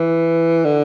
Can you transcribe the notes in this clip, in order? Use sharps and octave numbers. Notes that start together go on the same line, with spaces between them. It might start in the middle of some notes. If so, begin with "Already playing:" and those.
Already playing: E3
D3